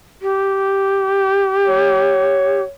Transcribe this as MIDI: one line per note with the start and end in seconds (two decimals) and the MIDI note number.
0.21 2.61 67
1.67 2.71 73